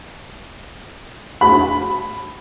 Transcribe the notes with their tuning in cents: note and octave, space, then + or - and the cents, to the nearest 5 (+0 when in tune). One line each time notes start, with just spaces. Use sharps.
B5 +10